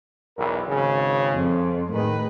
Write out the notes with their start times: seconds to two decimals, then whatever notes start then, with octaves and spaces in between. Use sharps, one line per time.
0.36 B1 E2 A#4
0.68 G#1 C#3
1.35 F2
1.92 A2 D#3 G#3 B4